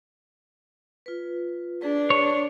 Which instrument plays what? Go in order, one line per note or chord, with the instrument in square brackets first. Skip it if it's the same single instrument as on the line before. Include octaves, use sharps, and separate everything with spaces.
[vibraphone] F4 B4
[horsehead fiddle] D4 [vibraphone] G#4 B4
[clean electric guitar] C#5